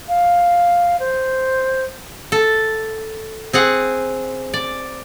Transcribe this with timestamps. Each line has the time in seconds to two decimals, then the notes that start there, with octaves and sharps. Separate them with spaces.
0.09 F5
1.00 C5
2.32 A4
3.53 C4 G#4 F#5
4.54 D5